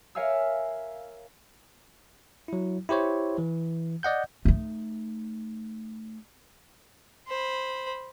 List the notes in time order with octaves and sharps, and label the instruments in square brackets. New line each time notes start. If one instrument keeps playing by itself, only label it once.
[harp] A#4 C#5 E5 F5 G#5 E6
[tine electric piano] F#3 E4
E4 G4 C5 C#5
E3
D5 D#5 F#5 G6
[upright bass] A3 D#4
[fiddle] C5 B5